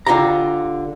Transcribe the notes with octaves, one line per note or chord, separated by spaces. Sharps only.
D3 F4 G4 A#5